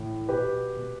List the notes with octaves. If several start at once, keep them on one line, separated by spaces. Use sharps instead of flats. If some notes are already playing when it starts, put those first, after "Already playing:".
Already playing: A2 E3
B2 G4 B4
B2